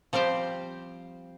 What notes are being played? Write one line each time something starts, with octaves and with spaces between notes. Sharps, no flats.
F3 G3 C4 G4 C5